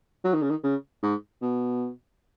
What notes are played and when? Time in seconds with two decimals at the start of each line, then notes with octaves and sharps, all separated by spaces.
0.24 F#3
0.34 D#3
0.42 C#3
0.50 D#3
0.64 C#3
1.03 G#2
1.42 B2